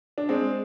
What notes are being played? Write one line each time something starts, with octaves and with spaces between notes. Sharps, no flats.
D4
G#3 C4